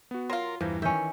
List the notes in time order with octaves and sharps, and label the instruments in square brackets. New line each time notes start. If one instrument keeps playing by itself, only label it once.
[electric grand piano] B3 F#4
[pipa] F#3 F4 [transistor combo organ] A#4 [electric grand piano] C6
[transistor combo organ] E2 G2 [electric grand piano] E3 [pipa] F3 [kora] A#4
[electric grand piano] D#3 E3 [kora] C#4 E5 [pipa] G5